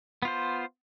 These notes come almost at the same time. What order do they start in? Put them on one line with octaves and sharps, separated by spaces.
B3 F4 C5